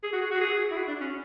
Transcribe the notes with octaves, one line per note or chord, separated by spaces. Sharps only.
G#4
F#4
G#4
F#4
G#4
E4
F#4
D4
C#4